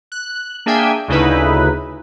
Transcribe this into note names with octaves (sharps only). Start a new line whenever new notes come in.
F#6
A#3 D4 G#4 E5 G5 G#5
D2 C#3 D#4 E4 B4